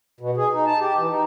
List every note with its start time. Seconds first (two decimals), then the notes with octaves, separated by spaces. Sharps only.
0.21 B2
0.37 G#4
0.54 D#4
0.67 A5
0.80 G4
0.97 E3
1.10 D#4